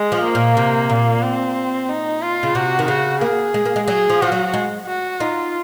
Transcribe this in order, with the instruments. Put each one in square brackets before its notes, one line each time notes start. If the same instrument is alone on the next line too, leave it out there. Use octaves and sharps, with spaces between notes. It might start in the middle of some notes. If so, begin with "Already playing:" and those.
Already playing: [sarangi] G#3
[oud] F3
[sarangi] A#3
[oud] A#2
C3
A#2
[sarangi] C4
D#4
F4
[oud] C#3
[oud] C3 [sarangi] F#4
[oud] D#3
[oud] C#3 [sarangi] F#4
[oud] A#3 [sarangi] G#4
[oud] G#3
A#3
G#3
[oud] F#3 [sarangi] G#4
[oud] F3
[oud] F3 [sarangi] F#4
[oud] F#3
G#3
[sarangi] F#4
[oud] D#4 [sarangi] F4